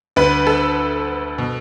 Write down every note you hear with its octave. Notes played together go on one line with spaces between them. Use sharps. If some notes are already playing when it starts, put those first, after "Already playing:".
D2 D3 B4
A4
B2